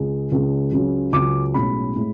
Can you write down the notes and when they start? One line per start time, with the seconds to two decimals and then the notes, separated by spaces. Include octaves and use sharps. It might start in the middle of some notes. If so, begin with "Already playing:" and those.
Already playing: C#2 C#3 G#3
0.32 C#2 C#3 G#3
0.72 C#2 C#3 F#3
1.13 C#2 C#3 F#3 D6
1.54 B1 A2 G#3 C#4 B5
1.96 A2 G#3